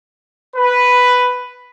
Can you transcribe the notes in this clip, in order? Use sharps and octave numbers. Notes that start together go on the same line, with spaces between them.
B4